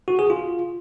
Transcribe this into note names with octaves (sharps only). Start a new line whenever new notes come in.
F#4
G#4
F4